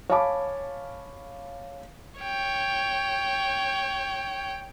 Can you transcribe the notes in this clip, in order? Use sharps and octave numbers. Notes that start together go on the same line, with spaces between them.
C#5 F5 G#5 A5 B5 D6
C#5 G5